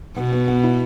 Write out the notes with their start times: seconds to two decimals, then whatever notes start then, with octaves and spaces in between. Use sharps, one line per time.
0.17 B2 B3
0.32 B3
0.48 B3
0.64 E4